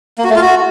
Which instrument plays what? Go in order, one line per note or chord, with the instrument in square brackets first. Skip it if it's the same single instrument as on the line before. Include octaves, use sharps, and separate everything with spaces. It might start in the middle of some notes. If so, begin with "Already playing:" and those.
[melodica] A#3
F#4
A3
F4
F#4